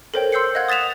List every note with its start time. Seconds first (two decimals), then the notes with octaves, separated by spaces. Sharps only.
0.14 A4 A#4 C5 C#5 G5
0.32 C6 E6 G6 C7 C#7
0.55 D#5 F5 F#5 F#6 G#6
0.69 D#6 A6 B6 E7 F7